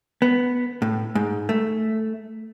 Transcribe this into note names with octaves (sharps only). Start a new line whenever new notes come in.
B3
A2
G#2
A3